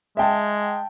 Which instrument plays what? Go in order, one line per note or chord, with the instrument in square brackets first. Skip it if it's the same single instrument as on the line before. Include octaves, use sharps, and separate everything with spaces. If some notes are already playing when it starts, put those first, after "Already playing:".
[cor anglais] G#3 [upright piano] E5 G5 A5